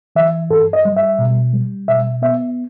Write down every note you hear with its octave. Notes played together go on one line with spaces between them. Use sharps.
E3 E5
G2 A4
D#5
G3
E5
B2
G3
B2 E5
B3 E5